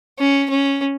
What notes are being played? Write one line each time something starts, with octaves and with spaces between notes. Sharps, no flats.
C#4
C#4